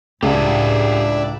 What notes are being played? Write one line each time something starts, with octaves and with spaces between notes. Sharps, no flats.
C#2 A2 D4 E4 G4 G#4 A5